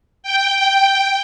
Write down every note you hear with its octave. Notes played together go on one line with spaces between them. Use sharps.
G5